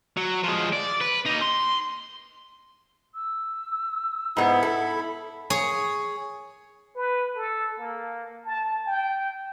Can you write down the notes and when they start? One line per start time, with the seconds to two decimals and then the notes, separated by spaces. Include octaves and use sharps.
0.17 F#3
0.44 F3 G#3
0.73 D5
1.01 B4
1.25 A#3 D#4
1.41 C6
3.15 E6
4.37 G#2 B3 E4 B5
4.63 A4
5.50 G#4 C#5
6.95 B4
7.36 A4
7.79 A#3
8.45 A5
8.86 G5